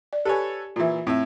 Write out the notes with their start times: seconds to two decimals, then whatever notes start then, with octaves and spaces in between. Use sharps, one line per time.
0.13 D5
0.25 G4 A4 B4 C#5 G#5
0.76 A#2 E3 F4 E5
1.07 A2 C4 E5